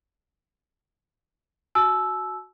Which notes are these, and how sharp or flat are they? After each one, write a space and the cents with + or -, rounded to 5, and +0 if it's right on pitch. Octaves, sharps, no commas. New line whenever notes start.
F#4 -5 A5 -45 E6 +0